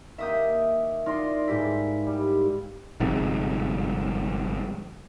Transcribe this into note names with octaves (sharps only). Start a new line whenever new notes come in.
D#3 A#3 E5 D#6 G6
D#4 F4 D5 C6
G#2 E4 G4 B6
G3
G1 F2 G#2 C3